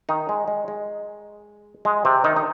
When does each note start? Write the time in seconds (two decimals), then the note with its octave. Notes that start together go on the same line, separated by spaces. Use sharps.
0.09 D#3 D#4
0.29 G#3
0.48 G#3
0.68 G#3
1.85 G#3
2.05 C3 C4
2.24 D#3 D#4
2.36 D#4